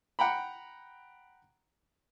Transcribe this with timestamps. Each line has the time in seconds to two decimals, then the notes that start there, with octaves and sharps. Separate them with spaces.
0.19 F#5 G5 A#5 B5